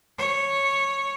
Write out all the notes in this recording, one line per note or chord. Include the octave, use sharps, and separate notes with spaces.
C#5